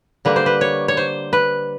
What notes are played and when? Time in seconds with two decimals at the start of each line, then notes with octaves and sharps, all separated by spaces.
0.25 D3 G3 A#3 B4
0.36 C5
0.46 B4
0.61 C#5
0.88 C#5
0.97 C5
1.33 B4